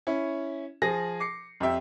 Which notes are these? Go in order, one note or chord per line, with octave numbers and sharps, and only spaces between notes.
C#4 E4
F3 G#4 A#6
D6 C7 C#7
F2 G4 E5 G5